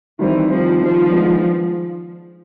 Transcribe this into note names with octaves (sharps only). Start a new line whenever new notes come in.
D#3 E3 G3 C4
D#3 F3 G3 C4
D#3 F3 G3 C4
D#3 G#3 B3 D4